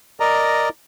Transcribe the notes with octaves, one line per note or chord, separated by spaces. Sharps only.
A#4 D5 D#5 A#5